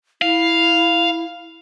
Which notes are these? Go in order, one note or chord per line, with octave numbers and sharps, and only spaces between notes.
E4 F5